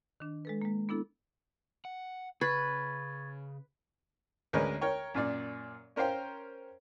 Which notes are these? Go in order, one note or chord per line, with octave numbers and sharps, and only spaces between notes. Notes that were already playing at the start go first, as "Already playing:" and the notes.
D#3 D4
G#3 A4 B4
G#3 A#3
B3 D4 E4 A4
F#5
C#3 B4 C#6 G#6 A6
D2 G#3 C#4 A#4 B4
A#4 C#5 G5
F#2 A#2 D5
C#4 A#4 C5 F5 G5